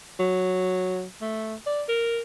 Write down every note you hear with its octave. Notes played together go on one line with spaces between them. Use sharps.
F#3
A3
D5
A#4